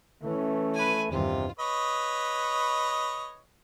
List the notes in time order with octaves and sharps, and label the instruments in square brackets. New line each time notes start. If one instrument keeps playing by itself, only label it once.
[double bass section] E3 C#4 [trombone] A3
[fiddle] B4 G#5
[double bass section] E2 G2 D#3 [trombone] C3 [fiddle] F4
[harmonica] B4 C#5 D#5